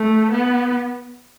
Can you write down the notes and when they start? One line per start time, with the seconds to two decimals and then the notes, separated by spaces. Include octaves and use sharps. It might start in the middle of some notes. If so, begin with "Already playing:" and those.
Already playing: A3
0.32 B3